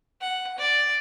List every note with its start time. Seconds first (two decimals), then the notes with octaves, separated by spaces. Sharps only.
0.21 F#5
0.58 D5